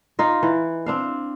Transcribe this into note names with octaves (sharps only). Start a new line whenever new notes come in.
D#4 F4 D#5
E3
C4 D4 F5